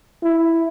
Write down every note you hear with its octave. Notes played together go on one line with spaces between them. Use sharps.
E4